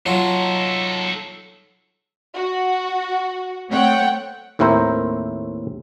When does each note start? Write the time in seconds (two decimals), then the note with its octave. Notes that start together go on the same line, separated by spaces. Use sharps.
0.06 F#3 D#4 F4 A4
2.34 F#4
3.69 A3 C4 C#5 F#5 G5
4.59 D#2 A2 C4 E4 A#4 C5